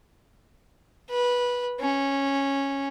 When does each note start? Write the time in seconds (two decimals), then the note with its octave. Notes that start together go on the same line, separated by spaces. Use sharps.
1.10 B4
1.81 C#4